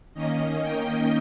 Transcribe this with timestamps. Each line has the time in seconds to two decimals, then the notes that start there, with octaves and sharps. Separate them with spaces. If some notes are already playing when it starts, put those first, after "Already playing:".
0.14 D#3 A#3 C#4 D#5
0.62 G5